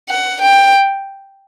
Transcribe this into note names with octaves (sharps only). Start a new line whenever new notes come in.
F#5
G5